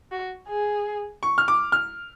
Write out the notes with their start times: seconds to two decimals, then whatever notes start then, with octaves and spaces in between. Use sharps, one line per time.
0.12 F#4
0.49 G#4
1.23 C#6
1.38 F6
1.48 D6
1.72 F6